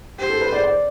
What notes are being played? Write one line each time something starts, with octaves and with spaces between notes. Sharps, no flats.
G4 C5
A4
B4
D5
D5